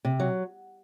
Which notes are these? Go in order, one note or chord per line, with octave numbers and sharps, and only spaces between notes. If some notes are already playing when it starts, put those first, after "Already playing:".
C3
F#3